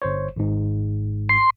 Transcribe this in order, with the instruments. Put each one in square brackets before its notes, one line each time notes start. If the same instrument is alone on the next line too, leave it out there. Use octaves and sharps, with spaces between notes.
[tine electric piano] G1 C5 C#5
G#1 G#2
[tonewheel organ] C6